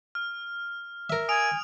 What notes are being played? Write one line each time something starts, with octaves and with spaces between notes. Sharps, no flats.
F6
A#4 E5
G#5 D#6 D7 F7